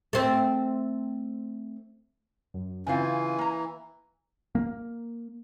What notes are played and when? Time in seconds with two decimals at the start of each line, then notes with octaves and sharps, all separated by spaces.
0.13 A3 C4
2.54 F#2
2.87 C#3 E3 C4 F4 G#5
3.38 A#3 A#5
4.55 A#3